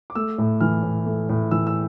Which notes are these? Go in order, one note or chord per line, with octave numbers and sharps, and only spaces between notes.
D6
A3 E6
A2
E3 F6
A2
A3
A2
E3 E6
E6